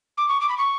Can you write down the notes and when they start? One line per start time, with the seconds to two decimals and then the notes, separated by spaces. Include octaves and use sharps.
0.18 D6
0.28 C#6
0.41 D6
0.49 B5
0.58 C#6